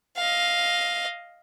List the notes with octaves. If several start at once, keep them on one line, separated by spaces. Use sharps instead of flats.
D#5 F5